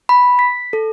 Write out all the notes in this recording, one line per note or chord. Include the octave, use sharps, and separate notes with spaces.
B5
B6
A4